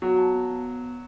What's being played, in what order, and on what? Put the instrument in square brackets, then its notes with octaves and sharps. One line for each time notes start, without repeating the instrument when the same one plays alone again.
[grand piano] F#3 [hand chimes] B3
[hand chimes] A5
B3
B3